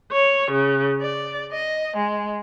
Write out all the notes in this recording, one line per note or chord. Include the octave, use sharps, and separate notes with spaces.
C#5
C#3
D5
D#5
G#3